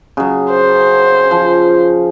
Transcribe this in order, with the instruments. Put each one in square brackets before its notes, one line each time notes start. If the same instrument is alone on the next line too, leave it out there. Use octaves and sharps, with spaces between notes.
[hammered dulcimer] C#3 F#3
[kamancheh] C5
[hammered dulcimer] F3